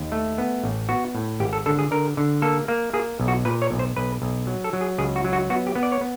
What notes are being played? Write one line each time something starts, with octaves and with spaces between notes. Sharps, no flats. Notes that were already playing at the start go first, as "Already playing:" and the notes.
Already playing: D#2
A3
B3
A1
B3 F#4
A2
G#1 G4
A4
D3 A4
G#4
D3 A#4
D3
A#3 A4
A#3
A#3 G#4
B1
F#4
A#2 B4
C#5
B1
C5
B1 B4
B1
F#3
A4
F#3
G#4
C#2 G#4
F#4
F#3
F#4
B3 F#4
G4
B3
D5
C#5
B3